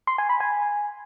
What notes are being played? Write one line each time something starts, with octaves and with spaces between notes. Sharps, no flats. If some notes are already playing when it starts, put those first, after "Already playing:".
C6
G#5
B5
G#5